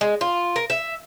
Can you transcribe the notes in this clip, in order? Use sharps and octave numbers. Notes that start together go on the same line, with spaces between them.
G#3
F4
A#4
E5